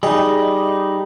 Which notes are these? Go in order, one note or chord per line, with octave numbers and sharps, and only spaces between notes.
G3 D#4 G#4 D#5